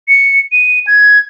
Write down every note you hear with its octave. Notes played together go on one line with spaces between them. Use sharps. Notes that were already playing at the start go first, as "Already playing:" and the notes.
C#7
D#7
G#6